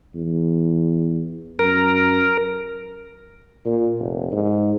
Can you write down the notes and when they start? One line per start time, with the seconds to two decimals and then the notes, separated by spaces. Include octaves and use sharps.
0.15 E2
1.59 F#2 A#4
3.65 A#2
4.00 F1
4.32 G#2